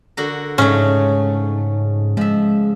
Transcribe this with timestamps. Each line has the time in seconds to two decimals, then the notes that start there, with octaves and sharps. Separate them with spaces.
0.17 D3 F#4 A#4
0.58 G#2 C#3 F#3 A3 C#4
2.17 F3 G#3 E5